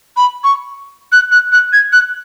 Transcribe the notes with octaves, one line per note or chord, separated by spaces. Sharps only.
B5
C#6
F#6
F#6
F#6
G#6
F#6